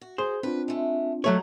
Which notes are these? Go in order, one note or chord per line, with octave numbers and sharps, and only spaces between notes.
F#4
G#4 C5
C4 D4 F4 B4
G#3 A3
A#2 F3 F#3 A3 D#4 C#5